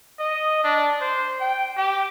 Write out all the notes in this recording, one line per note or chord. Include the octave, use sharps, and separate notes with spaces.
D#5
D4
C5
G5
G4